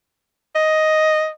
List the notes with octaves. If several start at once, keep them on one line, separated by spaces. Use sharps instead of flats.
D#5